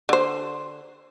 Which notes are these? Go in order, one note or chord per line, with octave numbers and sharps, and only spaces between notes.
D3 C5